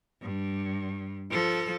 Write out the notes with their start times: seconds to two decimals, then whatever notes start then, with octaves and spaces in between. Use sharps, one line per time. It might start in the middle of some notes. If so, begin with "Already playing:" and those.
0.22 G2
1.30 F3 A4